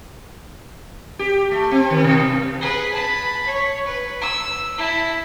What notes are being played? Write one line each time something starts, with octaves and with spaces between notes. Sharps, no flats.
G4
A3
C4
D#3
B2
G2
G#4 B4
A5 B5
C#5
B4
E6
E4 A5